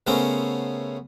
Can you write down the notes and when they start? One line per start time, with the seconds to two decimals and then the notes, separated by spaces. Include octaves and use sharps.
0.07 C#3 A3 B3 C#4 A#4 C5